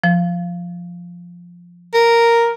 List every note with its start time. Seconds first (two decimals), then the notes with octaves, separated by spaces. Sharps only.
0.04 F3
1.94 A#4